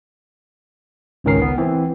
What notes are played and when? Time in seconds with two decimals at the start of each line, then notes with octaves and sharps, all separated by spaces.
1.24 G#1 C#2 D#3 C#4 A#4 C7
1.42 B3
1.58 E3 C4